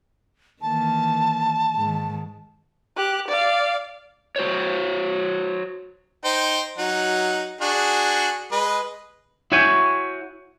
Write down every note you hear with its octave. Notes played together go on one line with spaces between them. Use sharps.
D#3 E3 A#3 A5
G#2 D#3
G4 F#6
D5 F5
F#4 C5 C#5
D#4 C5 G5
F#3 D#4 F#5
D4 F#4 G#4
G#3 B4 D#5
E4 F#4 C#5 G5 G#5